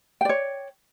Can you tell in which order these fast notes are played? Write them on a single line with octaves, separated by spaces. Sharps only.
G5 D5 C#5